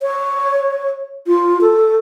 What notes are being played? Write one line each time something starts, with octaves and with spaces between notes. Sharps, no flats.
C#5
F4
A4